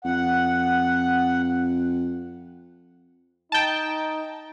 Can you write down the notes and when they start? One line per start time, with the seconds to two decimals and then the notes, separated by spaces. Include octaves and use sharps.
0.05 F2 F#5
3.52 D#4 G5 A5